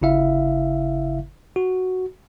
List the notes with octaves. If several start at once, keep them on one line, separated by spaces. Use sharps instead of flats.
G1 C#3 E4 E5 F5
F#4